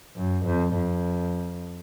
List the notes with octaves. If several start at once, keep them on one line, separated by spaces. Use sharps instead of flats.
F#2
F2
F2